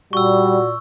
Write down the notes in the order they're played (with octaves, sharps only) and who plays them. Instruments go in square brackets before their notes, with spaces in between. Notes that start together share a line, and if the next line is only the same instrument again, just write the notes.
[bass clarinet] A#2 [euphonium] G3 [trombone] F#4 [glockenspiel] C#6 E6